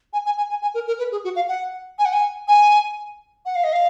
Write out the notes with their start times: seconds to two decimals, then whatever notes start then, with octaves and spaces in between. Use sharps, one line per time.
0.13 G#5
0.26 G#5
0.37 G#5
0.50 G#5
0.62 G#5
0.74 A#4
0.88 A#4
0.99 B4
1.12 G#4
1.24 F#4
1.36 F5
1.49 F#5
1.99 G#5
2.05 F#5
2.13 G#5
2.48 G#5
3.46 F#5
3.56 F5
3.64 D#5
3.73 F5